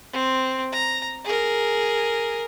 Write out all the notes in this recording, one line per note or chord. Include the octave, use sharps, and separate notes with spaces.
C4
A#5
G#4 A#4